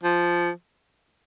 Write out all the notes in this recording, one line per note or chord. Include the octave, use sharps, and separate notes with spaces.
F3